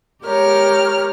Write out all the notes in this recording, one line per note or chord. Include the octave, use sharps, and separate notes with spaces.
G#3 G4 A#4 C#5 F6